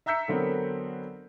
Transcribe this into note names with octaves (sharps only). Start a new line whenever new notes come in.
E5 A#5 E6 G6 B6 C#7
D3 F#3 B3 C4 A#4